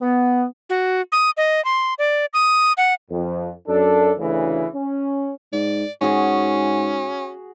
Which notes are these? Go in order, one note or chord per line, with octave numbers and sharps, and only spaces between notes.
B3
F#4
D#6
D#5
C6
D5
D#6
F#5
F2
F#2 D4 A4
D2 C#3 E3
C#4
G#2 D5
G#2 C#4 F#4 G#4